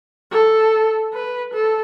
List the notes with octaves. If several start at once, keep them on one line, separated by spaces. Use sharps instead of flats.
A4
B4
A4